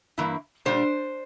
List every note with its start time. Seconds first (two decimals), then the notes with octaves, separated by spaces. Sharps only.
0.18 G2 E3 A#3 E4
0.65 A#2 G3 D4 C5